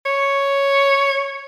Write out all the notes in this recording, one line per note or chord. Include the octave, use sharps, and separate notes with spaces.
C#5